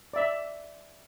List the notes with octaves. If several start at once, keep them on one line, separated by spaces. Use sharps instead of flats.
D5 E5